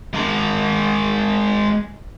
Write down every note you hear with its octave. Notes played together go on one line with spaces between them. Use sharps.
G#3 A#4